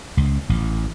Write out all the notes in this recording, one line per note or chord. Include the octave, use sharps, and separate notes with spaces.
C#2
A1